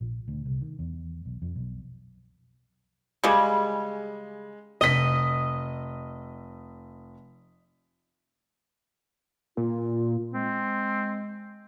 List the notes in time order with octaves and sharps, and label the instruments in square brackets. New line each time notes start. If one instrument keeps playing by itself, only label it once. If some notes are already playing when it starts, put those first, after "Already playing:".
[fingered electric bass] A#1
D2
C2
D#3
E2
B1
F2
B1
[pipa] C#3 G3 [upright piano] G#3 G#6
[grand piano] F1 B6 [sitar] D#5
[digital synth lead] A#2 [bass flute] F4
[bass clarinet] G#3 [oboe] C4